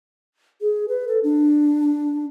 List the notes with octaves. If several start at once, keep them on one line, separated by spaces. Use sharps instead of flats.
G#4
B4
A4
D4